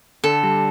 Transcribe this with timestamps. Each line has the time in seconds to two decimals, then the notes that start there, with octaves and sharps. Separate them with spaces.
0.24 D3 A4
0.43 G3